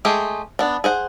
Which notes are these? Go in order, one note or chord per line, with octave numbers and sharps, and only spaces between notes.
G#3 A3 G4 G#4
B3 D4
G#4 C5 F#5